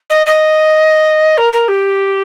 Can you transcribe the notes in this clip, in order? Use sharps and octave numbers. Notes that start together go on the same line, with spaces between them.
D#5
D#5
A#4
A#4
G4